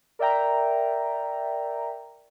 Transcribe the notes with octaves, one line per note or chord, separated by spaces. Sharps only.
A#4 D5 E5 G5 A#5